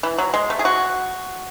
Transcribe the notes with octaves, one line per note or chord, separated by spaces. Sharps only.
E3
F#3
G#3
A3
G#4
F#4